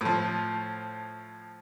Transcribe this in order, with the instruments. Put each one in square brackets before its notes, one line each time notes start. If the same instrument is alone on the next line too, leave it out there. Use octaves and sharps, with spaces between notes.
[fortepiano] A2 F3